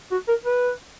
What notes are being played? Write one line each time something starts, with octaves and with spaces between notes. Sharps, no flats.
F#4
A#4
B4